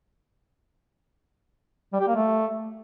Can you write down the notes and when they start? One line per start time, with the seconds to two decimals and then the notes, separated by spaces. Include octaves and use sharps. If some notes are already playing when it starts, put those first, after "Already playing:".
1.93 G3
2.01 G4
2.08 A#3
2.15 A3